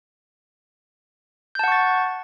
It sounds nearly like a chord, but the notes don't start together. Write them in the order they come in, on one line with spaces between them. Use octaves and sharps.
G6 A5 F#5 C#6 A6